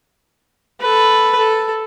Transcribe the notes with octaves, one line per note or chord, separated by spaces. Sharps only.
A4 B4
A4